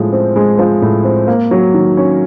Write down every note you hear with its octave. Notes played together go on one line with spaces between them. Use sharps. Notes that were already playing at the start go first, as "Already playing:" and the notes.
Already playing: A2 F3 G#3
C4
G#3
F3
A2
C4
A#3
F#3
D#3
C#4